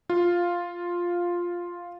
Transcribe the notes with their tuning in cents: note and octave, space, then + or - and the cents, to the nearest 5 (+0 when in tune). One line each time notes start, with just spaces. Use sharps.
F4 +5 F5 +0